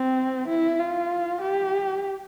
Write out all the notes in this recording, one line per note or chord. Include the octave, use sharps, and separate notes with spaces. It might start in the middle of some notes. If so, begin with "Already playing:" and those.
Already playing: C4
E4
F4
G4